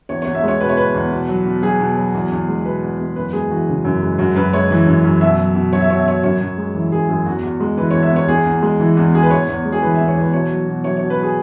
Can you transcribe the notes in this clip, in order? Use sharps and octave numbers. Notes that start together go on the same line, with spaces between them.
E2 C#5
E2 C#5
E5
G#3 C#5
B2 B4
C#5
E2 B4
E2
B2
F#3
B2
F#3 G#4
B2
F#3
E2
E2
G#3
B2 B4
E2
E2
F#2 B4
G#3 G#4
E3 F#4
C#3
F#2
G#3
F#2 F#4
F#2 B4
G#3 C#5
E3
F#2
F#2
B2 E5
F#3
B2
F#3 C#5
E5
B2 C#5
E5
F#3 C#5
F#2 C#5
F#2
G#3
E3
F#2 G#4
F#2 G#4
E2 F#4
E2
G#3
E3 B4
E2 C#5
E5
E2 C#5
E2 G#4
E2
G#3
E3
E2
E2 G#4
B4
E2 C#5
E2
G#3
G#4
E3 B4
E2 E5
C#5
E2 B4
B2 C#5
F#3
B2
F#3 C#5
B2 C#5
B4
F#3 G#4